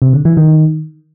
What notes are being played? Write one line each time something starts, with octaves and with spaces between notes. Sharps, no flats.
C3
D3
E3
D#3